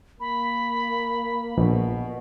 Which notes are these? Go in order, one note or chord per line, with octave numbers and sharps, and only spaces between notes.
A#3 B5
A#1 B2